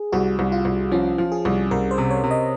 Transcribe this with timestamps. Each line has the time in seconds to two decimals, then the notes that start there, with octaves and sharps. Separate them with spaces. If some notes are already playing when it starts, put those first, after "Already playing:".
Already playing: G#4
0.12 C2 F#4
0.39 C2
0.52 F4
0.65 C2
0.92 F3 C#4
1.18 F3
1.32 G#4
1.45 C2
1.71 C2 A#4
1.91 C5
1.98 C3
2.10 C#5
2.24 C3
2.31 D#5